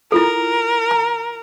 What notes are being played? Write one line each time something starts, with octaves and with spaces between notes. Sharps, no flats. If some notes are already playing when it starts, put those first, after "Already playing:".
E4 F4 A4 A#4
A#5